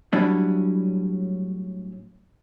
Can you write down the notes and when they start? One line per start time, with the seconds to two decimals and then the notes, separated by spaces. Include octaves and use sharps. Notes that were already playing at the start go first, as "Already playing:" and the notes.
0.13 A2 F#3 G3 C#4 D4 E4